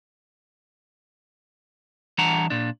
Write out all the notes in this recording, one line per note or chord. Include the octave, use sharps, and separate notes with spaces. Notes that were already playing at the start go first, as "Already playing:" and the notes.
E3 G3 D4 F#5 A5 A#5
A#2 D4